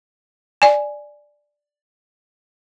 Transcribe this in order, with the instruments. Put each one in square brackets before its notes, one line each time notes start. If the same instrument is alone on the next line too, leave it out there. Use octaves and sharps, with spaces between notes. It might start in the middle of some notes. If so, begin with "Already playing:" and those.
[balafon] D5 G#5